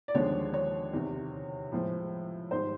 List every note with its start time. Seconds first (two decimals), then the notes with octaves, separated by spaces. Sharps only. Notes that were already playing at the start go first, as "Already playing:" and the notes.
0.08 D5
0.14 D#2 D3 F3 G#3 C#5
0.54 C#5
0.93 E2 C3 D#3
1.72 A2 F3 G#3
2.51 G#2 D#3 G3 C5